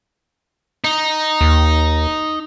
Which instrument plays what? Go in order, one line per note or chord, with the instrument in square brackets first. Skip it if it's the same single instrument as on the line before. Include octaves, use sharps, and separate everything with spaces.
[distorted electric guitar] D#4
[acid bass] D#2